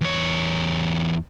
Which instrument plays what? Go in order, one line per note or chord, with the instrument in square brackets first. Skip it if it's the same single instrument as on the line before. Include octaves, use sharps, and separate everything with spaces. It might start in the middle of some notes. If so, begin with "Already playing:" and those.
[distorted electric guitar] E2 C#5